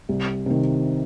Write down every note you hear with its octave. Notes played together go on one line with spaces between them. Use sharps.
C2
C3 D#3